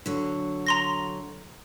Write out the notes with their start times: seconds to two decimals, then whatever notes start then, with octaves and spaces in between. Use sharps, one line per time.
0.06 D3 F#3
0.67 A#5 C6 A#6